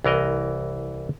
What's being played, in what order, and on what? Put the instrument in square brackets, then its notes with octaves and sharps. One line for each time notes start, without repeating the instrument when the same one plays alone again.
[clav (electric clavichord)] C2 E3 A#4 D#5 F#5